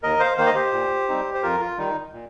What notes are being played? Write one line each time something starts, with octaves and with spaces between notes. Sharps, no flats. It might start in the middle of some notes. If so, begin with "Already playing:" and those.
D#2 A#4 D#5
C5 F5
D#3 A#3 D#4 C5 F5
D#5
G4 C5
A#2
G3 C4 D#4
C5
F2 F4 A#4
F4
D#3 G3 D#4
A#2